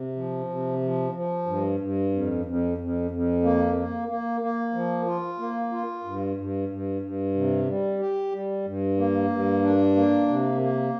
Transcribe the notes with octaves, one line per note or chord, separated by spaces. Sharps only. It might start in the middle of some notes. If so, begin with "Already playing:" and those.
Already playing: C3
F3
C3
F3
F3
G2
G2
F2
F2
F2
F2
A#3
A#3
A#3
A#3
F3
F4
A#3
F4
G2
G2
G2
G2
C3
G3
G4
G3
G2
A#3
G2
D4
A#3
C3
A#3